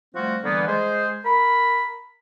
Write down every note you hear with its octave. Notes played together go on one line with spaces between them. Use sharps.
F3 G3 A3 C4 F4 F#4
D3 E3 G3 A#3 B3
G#3 G#4 C5
A#4 B5